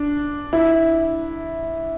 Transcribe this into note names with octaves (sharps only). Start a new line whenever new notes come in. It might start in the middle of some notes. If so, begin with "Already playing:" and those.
Already playing: D4
E4